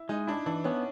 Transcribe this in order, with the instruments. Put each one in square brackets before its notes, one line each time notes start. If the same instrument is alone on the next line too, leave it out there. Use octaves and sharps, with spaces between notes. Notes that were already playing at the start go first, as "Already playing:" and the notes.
Already playing: [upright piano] E4
[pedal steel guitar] G#3 [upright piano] D#4
[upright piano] D4 [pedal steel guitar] E4
[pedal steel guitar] E3 [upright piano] D4
[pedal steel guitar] B3 [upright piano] C#4